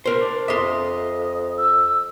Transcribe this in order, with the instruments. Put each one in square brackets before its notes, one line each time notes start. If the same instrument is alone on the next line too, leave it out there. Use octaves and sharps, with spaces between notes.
[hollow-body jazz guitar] A#4 C5
[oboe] D4
[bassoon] F2 [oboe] D#5 [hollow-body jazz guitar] E5 C6
[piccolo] E6